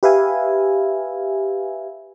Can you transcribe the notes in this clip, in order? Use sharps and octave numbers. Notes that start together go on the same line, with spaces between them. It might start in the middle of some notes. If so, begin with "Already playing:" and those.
G4 B4 E5 F5 G#5